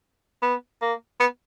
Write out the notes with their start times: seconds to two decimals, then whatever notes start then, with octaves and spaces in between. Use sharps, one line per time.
0.42 B3
0.82 A#3
1.20 B3